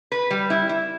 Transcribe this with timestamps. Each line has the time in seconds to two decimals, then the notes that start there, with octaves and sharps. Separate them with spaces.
0.12 B4
0.31 G3
0.50 E4
0.69 E4